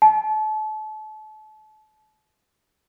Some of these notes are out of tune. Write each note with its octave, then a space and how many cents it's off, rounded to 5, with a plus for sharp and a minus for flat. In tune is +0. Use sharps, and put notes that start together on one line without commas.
A5 -35